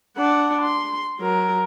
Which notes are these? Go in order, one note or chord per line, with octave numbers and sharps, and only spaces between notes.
D4 F#5
C6
F#3 A#4